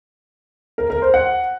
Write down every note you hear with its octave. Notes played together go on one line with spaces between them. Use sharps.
A#4
A#4
C5
F#5